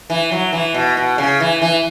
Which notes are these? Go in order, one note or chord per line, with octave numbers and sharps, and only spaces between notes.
E3
F#3
E3
B2
B2
C#3
E3
E3